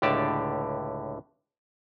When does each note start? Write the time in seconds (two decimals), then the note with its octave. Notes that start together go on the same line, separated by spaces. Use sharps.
0.02 C#2 A2 D3 G4 D5 A5